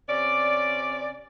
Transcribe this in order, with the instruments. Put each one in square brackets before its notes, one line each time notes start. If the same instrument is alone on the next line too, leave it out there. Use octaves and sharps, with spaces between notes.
[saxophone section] C3 C#4 D5